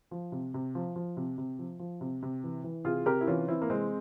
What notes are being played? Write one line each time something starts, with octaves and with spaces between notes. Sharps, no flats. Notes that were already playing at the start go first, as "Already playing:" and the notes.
F3
C3
C3
F3
F3
C3
C3
F3
F3
C3
C3
E3
E3
C3 F4 G#4
C3 G4 A#4
E4
E3 C#4 F4
E3 C4 E4
A#3
C3 G#3 C4